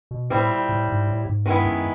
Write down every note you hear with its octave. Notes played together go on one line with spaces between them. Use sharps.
B2
A2 G3 C4 E4
A#2
A2
G#2
A2
G#2
G2 D#3 G#3 B3 E4
F#2